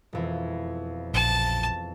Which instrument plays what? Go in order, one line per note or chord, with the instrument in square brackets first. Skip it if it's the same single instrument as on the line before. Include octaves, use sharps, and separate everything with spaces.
[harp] E1 F2 E3
[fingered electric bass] A#1 [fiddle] A5